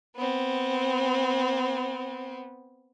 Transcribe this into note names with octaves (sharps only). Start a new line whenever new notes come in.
B3 C4